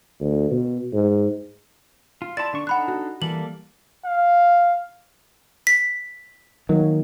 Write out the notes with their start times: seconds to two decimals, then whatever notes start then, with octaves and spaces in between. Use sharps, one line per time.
0.20 D2
0.51 B2
0.93 G#2
2.22 F4
2.37 E4 D5 A5 C6 A6
2.53 D3 D4 C#6
2.67 D4 D#4 A4 F#5 B5 F#6
2.88 F#4
3.22 E3 G3 A#3 A4 F#7
4.05 F5
5.67 B6
6.69 D#3 F#3 A#3